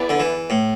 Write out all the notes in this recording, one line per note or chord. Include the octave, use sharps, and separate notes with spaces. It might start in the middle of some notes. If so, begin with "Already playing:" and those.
Already playing: B3 E4 G#4 B4 D5
D3
E3
A2